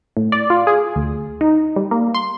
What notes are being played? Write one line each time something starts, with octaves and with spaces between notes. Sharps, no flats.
A2
D5
F4
G#4
D2
D#4
G3
A#3
C6